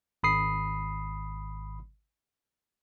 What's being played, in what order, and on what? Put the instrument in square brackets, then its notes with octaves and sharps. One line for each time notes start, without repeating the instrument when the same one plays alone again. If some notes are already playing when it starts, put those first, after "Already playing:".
[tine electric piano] G#1 B5 D#6 C7